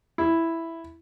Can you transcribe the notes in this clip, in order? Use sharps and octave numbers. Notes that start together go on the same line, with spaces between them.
E4